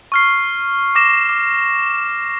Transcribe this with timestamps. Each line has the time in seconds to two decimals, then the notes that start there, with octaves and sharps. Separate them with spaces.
0.12 C#6 F6 C7
0.95 D6 A#6 E7
1.29 D6